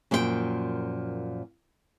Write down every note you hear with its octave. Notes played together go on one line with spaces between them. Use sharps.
F#2 A#2 F3 G4 G5